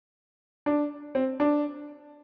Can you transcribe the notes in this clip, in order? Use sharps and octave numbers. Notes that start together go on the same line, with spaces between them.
D4
C4
D4